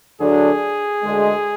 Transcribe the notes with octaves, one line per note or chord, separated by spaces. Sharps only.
D2 D3 F#3 D4 G#4
D2 D3 G#3